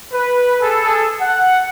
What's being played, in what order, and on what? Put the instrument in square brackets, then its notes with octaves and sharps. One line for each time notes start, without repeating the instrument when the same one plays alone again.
[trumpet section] B4
G#4 A4
F#5